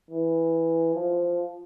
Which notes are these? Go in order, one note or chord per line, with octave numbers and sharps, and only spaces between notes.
E3
F3